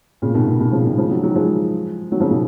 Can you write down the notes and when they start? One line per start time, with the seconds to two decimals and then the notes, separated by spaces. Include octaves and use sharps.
0.22 A#2 C#3
0.34 B2 D#3
0.47 B2 D#3
0.60 B2 D#3
0.72 C#3 F3
0.85 B2 D#3
0.97 C#3 F3
1.10 D#3 F#3
1.23 D#3 F#3
1.36 F3 G#3
2.12 D#3 F#3
2.20 C#3 F3
2.30 B2 D#3